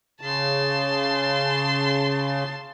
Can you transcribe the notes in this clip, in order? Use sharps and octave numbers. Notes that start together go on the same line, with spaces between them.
C#3 A5 C6